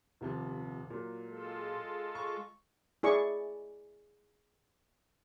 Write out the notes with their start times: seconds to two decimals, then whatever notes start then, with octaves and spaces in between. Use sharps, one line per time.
0.21 D#1 C3 F3
0.90 A#2 F#3
1.27 G#3 F4 A4
2.15 C#6
3.03 E4 G#4 D5 C#6